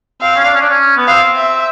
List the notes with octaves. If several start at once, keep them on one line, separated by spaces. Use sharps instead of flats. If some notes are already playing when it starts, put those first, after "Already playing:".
C4 F5
C#4
D4
C#4
D4
C#4
B3
C4 F5
E5